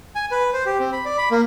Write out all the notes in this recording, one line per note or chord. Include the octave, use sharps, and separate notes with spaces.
G#5
B4
C5
G4
C4
B5
D5
B5
A#3